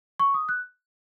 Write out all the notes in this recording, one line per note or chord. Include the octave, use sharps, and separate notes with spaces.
C#6
D#6
F#6